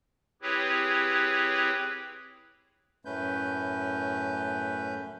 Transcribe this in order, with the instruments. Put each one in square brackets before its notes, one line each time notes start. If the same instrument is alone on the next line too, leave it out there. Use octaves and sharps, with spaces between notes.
[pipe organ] C4 E4 G4 G#4 B4 C#5
[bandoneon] F#2 A2 A3 C#4 B4 G6